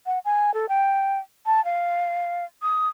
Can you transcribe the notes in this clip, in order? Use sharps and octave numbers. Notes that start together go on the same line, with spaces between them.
F#5
G#5
A4
G5
A5
F5
D#6